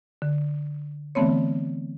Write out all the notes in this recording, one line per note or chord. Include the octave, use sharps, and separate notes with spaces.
D3
D3 E3 A3 B3 C4 C#5